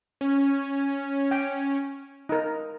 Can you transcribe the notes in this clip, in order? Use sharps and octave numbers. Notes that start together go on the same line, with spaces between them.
C#4
G5
D#4 A#4